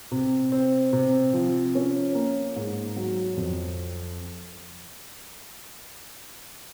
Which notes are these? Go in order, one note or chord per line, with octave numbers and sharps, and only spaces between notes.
C3
C4
C3
F3
C#4
A#3
G#2
F#3
F2